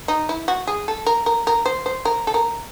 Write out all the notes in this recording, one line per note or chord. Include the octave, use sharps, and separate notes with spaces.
D#4
E4
F#4
G#4
A4
A#4
A#4
A#4
C5
C5
A#4
A4
A#4